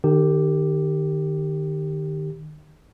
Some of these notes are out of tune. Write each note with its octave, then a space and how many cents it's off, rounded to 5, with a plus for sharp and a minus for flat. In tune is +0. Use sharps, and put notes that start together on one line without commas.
D#3 -35 G4 +0